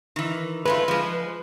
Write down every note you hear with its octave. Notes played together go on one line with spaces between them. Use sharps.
D#3 E3
G#3 A3 F4 B4
F3 G#3